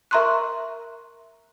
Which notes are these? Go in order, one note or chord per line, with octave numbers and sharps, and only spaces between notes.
A#4 E5 A#5 C6 C#6 F#6